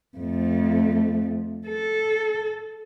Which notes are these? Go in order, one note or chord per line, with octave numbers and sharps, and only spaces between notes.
F2 A3
A4